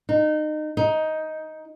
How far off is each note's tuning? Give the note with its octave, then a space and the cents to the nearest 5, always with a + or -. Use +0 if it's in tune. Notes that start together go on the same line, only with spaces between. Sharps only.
D#4 -25
D#4 +10